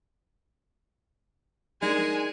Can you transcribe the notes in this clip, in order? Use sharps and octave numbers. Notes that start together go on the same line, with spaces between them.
G#3 D4 D#4 A#4 G#5